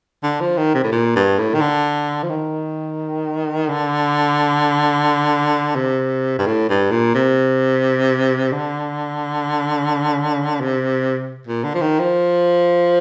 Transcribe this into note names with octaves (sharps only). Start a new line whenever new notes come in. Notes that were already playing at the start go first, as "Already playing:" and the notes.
D3
F3
D#3
C3
A2
A#2
G2
A2
D#3
D3
F3
D#3
D3
C3
G2
A2
G2
A#2
C3
D3
C3
A#2
D3
F3
D#3
F3